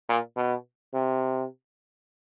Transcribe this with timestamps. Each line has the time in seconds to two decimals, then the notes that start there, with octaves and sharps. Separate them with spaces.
0.09 A#2
0.36 B2
0.94 C3